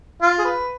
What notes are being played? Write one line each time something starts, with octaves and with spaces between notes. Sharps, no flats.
F4
G#4
B4